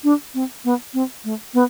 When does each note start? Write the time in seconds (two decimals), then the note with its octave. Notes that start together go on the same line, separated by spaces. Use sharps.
0.04 D4
0.34 C4
0.65 B3
0.94 C4
1.24 A3
1.54 B3